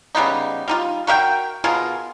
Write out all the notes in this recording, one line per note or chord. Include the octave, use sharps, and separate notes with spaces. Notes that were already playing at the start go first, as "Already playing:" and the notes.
C#3 G3 B3 D#4
G3 D#4 F4
F#4 A#4 E5 G5
B2 F4 G#4 A#4